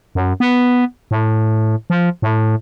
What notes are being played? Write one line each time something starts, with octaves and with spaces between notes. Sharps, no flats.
F#2
B3
A2
F3
A2